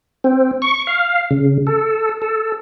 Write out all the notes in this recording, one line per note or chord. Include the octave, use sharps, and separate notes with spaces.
C4
C#6
F5
C#3
A4
A4